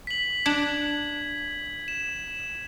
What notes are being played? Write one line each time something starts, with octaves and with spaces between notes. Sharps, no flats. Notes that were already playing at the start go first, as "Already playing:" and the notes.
B6 F#7
D4 G#6
E7